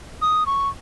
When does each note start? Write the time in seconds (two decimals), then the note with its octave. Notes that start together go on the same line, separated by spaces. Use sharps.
0.22 D#6
0.46 C#6